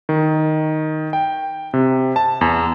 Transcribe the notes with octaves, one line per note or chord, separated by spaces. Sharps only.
D#3
G5
C3
A5
E2